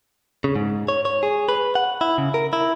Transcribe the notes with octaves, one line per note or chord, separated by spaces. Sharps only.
C#3
G#2
C#5
C#5
G#4
B4
F#5
E4
C#3
A#4
E4